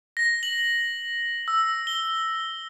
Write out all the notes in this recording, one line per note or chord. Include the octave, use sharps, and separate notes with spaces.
A#6
F#7
E6
G7